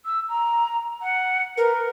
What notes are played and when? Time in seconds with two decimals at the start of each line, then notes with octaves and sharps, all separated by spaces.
0.06 E6
0.29 A#5
1.02 F#5
1.57 A#4 B4